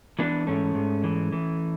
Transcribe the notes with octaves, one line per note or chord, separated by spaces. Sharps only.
E3 B3 D4
G#2 A3 C#4
G#2
E3
E3